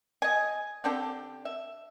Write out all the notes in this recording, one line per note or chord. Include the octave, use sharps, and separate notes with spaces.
D#5 G#5
D3 C4 D4 G4
E5